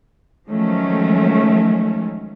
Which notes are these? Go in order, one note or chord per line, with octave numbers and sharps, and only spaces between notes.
D#3 F3 F#3 G#3 A3 C#4